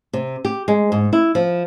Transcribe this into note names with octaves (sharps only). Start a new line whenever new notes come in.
C3
G4
G#3
G#2
E4
F3